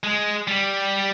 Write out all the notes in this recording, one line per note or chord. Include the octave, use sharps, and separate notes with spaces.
G#3
G3